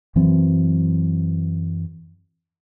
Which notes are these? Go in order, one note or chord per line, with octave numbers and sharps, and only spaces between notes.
F#2 E3 F#3 C4